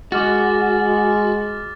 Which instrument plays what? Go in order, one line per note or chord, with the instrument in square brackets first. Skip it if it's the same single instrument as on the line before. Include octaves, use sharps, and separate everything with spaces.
[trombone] G#3 [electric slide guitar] F#4 [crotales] D6 F6 A6